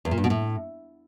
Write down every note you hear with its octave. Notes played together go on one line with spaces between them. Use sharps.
E2
A#2
G2
B2
A2